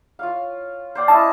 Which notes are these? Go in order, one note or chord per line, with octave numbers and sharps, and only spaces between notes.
F4 C#5 F5
C5 D5 G5
C#4 E4 D#5 A5